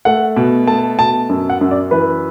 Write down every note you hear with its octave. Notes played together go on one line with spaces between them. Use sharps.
A3 F#5
B2
A3 A5
B2 A5
F#2
F#5
F#2
D5
E3 B4